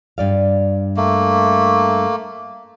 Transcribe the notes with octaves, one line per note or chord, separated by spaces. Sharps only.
G2 D5 F5
A3 A#3